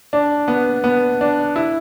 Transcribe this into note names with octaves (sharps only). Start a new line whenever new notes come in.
D4
B3
B3
D4
E4